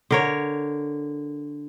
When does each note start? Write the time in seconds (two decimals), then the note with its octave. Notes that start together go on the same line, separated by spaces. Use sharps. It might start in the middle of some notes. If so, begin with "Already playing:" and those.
0.11 D3 A#4 C#5